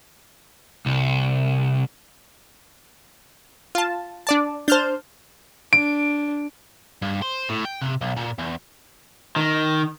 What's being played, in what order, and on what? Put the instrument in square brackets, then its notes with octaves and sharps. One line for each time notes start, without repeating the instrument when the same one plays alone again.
[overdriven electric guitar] C2
[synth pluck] F4 A5
D4 D5 A5
[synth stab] D4 C5 [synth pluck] A5 F6 G6
[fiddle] D4 [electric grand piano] D7
[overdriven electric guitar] G2
C5
A2
G5
C3
B1
A#2
E2
D#3